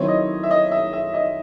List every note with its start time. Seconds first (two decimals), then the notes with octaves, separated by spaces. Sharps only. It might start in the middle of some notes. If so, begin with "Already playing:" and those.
Already playing: D#3 F#3 C4 E4 C5 C#5
0.08 D#5
0.43 E5
0.51 D#5
0.71 E5
0.93 E5
1.14 D#5